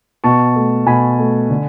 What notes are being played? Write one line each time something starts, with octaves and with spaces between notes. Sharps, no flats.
B2 A5 C#6
A3
B2 G#5 B5
A3
D3